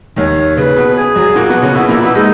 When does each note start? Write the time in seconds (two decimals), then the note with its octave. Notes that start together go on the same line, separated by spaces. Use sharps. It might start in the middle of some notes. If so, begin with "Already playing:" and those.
0.16 D#2 D#3 C#5
0.57 C#3 B4
0.76 B2
0.96 G#4
1.16 F#2 F#3
1.36 A#2 A#3 F#4
1.49 B2 B3
1.62 C#3 C#4
1.75 B2 B3 E4
1.89 A#2 A#3 E4
2.02 B2 B3 E4
2.15 G#3 D#4